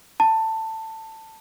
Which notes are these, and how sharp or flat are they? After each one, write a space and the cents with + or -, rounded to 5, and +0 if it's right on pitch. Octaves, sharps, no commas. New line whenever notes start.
A5 +15